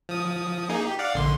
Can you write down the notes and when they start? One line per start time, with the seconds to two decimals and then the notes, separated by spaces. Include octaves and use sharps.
0.09 F3 D#6
0.69 A#3 D#4 G#4
0.85 D#4 G4
0.99 D5 F5 F#5
1.14 A#1 D3 C6